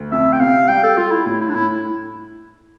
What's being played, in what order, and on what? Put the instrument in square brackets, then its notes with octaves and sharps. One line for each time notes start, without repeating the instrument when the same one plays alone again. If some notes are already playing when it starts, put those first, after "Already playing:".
Already playing: [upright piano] D2
[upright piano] F2 [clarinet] E5
[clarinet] G5
[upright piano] C3 [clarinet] F5
[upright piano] G3 [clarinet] G5
[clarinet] A4
[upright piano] G3 [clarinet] F4
[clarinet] E4
[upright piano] A2 [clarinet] E4
[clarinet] E4
D4
[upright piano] A2 [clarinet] E4